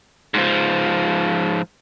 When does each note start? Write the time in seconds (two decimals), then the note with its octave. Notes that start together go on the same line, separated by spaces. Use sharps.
0.34 G#2 F3